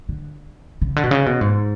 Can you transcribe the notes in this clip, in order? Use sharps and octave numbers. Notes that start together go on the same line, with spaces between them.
D3
C#3
D3
B2
C#3
B2
G#2